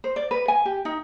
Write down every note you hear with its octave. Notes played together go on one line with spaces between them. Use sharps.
C5
D5
B4
G#5
G4
D#4